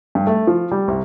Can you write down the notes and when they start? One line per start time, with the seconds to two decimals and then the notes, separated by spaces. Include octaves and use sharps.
0.15 G2
0.27 A3
0.47 F3
0.71 G3
0.88 C2